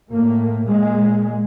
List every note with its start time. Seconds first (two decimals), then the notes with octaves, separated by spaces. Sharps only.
0.10 A2 A#3
0.68 A#2 G#3